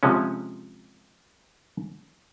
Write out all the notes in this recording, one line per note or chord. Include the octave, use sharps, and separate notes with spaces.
C3 F3 G#3 C#4